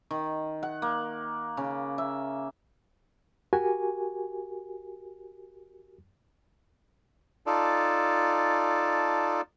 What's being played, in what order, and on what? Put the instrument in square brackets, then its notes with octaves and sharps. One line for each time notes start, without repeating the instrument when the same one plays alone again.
[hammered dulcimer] D#3
F#5
A#3
C#3
E5
[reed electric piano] F#4 G4 A#4 G#5
[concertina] D#4 F4 A4 D5 A5